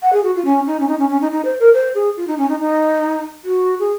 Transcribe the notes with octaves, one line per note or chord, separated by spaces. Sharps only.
F#5
G#4
F#4
F4
C#4
D#4
C#4
D#4
C#4
C#4
D#4
D#4
C5
A#4
C5
G#4
F4
D#4
C#4
D#4
D#4
F#4
G#4